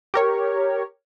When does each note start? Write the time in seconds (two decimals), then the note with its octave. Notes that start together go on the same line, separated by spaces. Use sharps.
0.14 G4 A#4 C#5